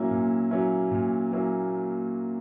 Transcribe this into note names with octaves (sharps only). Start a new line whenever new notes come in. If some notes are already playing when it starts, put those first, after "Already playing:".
Already playing: A#2 F#3 A#3 C#4 E4
A#2
F#3 A#3 C#4 E4
A#2
F#3 A#3 C#4 E4